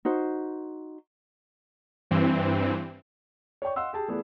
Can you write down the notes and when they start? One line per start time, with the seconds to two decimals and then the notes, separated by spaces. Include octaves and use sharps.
0.05 D#4 F#4 C5
2.11 G2 E3 C4
3.62 C#5 D5 G5 C#6
3.76 D#5 F5 F#5 C6 E6
3.93 G4 G#4 A5
4.08 E3 A3 B3 G#4 D5